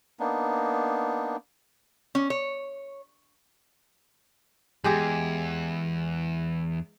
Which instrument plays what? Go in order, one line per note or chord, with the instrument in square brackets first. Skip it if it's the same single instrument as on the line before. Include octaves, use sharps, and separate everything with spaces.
[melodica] A#3 B3 D4 D#4
[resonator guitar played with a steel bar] C#4
C#5
[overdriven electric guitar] E2 [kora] G#3 G4 G#4